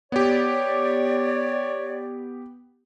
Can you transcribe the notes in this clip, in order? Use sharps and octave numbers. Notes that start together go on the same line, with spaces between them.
B3 G4 C#5 D5